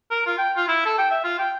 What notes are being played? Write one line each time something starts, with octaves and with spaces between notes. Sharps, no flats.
A#4
F4
G5
F4
E4
A4
G5
E5
F4
G5